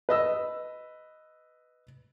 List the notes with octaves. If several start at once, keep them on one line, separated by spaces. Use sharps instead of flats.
B4 D#5 E6